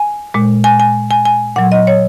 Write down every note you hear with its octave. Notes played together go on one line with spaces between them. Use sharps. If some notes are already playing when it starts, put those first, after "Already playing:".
Already playing: G#5
A#2 G#3
G#5
G#5
G#5
G#5
A#2 F#3 F#5
D#5
C#5